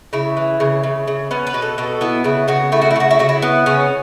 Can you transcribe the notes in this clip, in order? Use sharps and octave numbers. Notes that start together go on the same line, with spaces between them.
C#3 E4
E3
C#3
C#3
C#3
B3 C#4
B4
B2
A4
B2 A4
B3 E4
C#3 E4
C#3 F#4
A3 E4
F#4
E4
C#3 F#4
E4
C#3 F#4
E4
B3
C#3 C#4